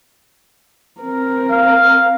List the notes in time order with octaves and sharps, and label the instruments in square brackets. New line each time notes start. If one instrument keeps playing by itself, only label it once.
[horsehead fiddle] C4 A#4
[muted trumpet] F5